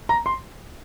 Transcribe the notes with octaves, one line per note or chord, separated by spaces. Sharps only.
A#5
C6